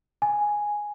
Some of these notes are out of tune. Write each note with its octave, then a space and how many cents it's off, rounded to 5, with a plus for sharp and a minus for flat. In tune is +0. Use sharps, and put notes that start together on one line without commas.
G#5 +0